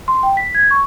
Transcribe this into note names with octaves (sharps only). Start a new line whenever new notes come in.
C6
G5
B6
G#6
C#6